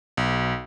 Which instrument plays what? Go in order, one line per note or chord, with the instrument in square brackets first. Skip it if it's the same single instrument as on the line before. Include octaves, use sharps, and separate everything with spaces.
[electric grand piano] B1